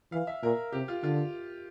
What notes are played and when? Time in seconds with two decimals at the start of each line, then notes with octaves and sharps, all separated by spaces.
0.12 E3 F5
0.27 E5
0.43 A#2 A#4
0.73 C3 G4
0.88 F4
1.03 D3 F4